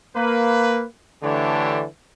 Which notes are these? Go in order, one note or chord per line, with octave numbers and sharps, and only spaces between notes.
A#3 B4
D3 E3 A3 D4 G4 C#5